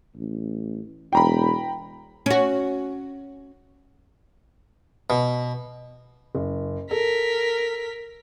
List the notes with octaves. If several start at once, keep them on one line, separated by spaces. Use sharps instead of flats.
A1
E1 G5 A#5 B5
C#4 F#4
B2
F#1
A4 A#4 B6